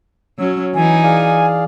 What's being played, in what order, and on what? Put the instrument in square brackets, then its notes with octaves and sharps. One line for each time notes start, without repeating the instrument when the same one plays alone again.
[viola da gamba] F#3 C#4 [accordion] E6
[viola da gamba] E3 D#4 [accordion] F#3 [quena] G#5
[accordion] G#4 D5 F5